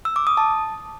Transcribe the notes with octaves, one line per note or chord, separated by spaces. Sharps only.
E6
D6
D#6
A5